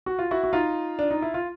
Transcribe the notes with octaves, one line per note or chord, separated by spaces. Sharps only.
F#4
F4
E4 F#4
F#4
D#4 F4
D4
D#4
E4
F4